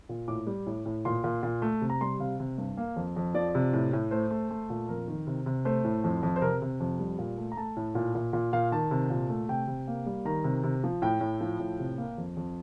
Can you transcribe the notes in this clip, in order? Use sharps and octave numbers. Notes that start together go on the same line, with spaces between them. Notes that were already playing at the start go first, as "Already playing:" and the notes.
A#2
A2 D6
G3
A2
A2
A#2 C6
A#2
A#2
A3
C3
A#5
G3 C6
C3 F5
C3
G2
A#3
F2
F2
F3 D5
C3
A2
A2
A3 C5
A3
A3
A#2
F2 A#4
D#3
C3
C3
A3 C5
A2
F2
F2
C5
C3 A#4
C3
F2
G3
A#2
A3
A#5
A3 A5
A2
A#2
A#2
A#2
A#2 F5
D#3 A5
C3
A#2
A3
C3 G5
C3
A#3
G3
D#3 A#5
C3
C3
F3
A2 G5
A2
F3
A2
C3
A#3
F2
F2